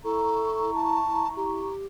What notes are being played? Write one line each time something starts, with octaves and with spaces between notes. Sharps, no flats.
E4 A4 A#5 C#6
A5
G4